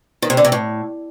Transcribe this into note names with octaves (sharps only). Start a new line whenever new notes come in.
D#3
C3
D3
C3
A2